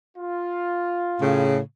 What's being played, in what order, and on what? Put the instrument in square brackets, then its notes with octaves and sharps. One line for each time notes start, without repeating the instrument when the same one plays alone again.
[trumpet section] F4
[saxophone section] A2 C#3